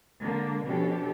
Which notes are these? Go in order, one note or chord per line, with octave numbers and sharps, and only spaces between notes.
D3 G#3 A#3
B2 F3 C#4 D4 G4 A4